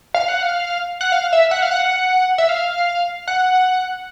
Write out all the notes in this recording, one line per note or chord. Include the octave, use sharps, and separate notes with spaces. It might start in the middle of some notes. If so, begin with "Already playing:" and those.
F5
F#5
F5
F#5
F5
E5
F#5
F5
F#5
E5
F5
F#5